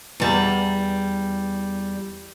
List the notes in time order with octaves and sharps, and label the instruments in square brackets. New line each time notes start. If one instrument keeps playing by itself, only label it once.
[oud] E2 G3